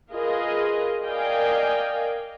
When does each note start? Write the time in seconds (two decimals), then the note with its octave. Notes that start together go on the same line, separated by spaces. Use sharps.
0.12 F4 G#4 A#4 B4 D#5
1.03 A#4 D5 D#5 F5 G5 G#5